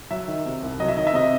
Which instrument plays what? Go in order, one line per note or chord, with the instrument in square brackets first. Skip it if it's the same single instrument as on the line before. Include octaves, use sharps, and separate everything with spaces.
[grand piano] F#3 E5
D#3
C3
C2
F#3 D#5
E5
D#3 D#5
E5
C3 D#5